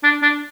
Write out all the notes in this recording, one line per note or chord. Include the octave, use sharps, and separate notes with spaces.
D4
D4